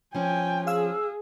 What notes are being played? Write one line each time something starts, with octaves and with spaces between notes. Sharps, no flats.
F3 C#4 G5 G#5
G#4 F5 E6